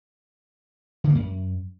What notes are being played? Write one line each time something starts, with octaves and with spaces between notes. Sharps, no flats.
D3
A#3
F#2